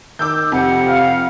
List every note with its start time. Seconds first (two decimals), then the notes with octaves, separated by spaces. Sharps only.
0.19 D#3 D6 E6 G6
0.52 F2 C3 F#5
0.88 F5